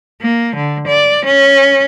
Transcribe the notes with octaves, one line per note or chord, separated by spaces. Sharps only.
A#3
D3
D5
C#4